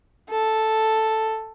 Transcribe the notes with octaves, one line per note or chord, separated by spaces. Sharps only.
A4